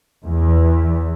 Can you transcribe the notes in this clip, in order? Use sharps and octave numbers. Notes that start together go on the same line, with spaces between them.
E2